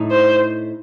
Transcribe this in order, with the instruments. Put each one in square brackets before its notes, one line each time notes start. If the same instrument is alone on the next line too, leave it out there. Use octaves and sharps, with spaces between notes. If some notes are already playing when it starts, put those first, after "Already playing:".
Already playing: [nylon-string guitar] A2 A3 D#4
[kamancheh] C5